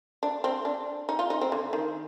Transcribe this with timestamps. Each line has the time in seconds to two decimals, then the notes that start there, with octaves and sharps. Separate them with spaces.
0.23 D4
0.44 C4
0.65 D4
1.09 D#4
1.19 F4
1.30 D#4
1.41 C4
1.52 D3
1.73 D#3